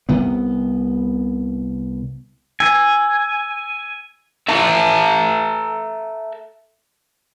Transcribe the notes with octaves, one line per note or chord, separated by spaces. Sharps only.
C2 C3 B3
G#5 E6
A4 E5 A5 A#5